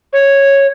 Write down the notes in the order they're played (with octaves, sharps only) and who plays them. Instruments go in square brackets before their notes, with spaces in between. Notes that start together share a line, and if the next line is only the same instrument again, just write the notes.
[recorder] C#5